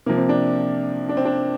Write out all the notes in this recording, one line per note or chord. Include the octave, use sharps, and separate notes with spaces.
C3 F3 A#3
C4
D4
D4
C4
D4